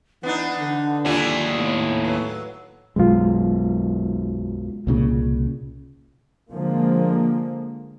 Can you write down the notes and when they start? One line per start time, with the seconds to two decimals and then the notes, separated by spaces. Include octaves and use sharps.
0.23 E3 B3 D4 D#4 F#5
0.58 D3
1.05 D#2 G3 D4 E4 F4 G#4
1.55 A2 B3
2.04 F#3 B4
2.96 B1 F#2 B2 G#3 F4
4.87 C2 A#2 C#3
6.51 D3 F3 G#3 A#3